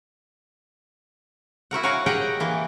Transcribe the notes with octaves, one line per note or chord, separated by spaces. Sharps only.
E4 F#4 A#4 F#5
A#4 C#5 F5 F#5 G#5
G4 G#4 A#4 D#5 F#5 G5
E3 A#3